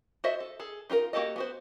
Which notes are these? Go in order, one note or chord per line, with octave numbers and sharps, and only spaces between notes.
F#4 C5 D#5 E5
A4
G#4 A4
D#4 F4 F#4 A#4
A#3 F#4 G4 A4 D#5
B3 F#4 C5